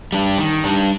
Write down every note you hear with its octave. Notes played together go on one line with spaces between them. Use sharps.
G3 D4
D#3
G3 D4